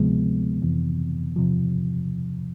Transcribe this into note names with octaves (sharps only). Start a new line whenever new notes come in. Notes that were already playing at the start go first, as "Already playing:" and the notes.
Already playing: D2 C3 F3 G#3 B3
F2 C3 E3
E2 C3 F3